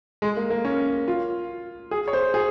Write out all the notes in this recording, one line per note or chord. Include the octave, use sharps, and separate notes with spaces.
G#3
A#3
A#3
C#4
F4
G#4
C#5
C5
G#4